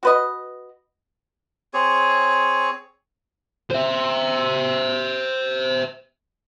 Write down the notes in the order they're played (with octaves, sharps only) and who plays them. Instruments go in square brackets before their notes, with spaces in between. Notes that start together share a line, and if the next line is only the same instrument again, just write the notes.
[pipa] F#4 B4 D#5
[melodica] C4 G#4 C#5
[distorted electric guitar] C5 E5